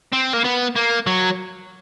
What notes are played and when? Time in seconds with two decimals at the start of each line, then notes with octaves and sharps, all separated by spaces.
0.12 C4
0.33 A#3
0.44 B3
0.75 A#3
1.07 F#3